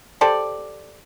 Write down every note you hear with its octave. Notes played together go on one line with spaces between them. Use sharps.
G4 A4 C5 D5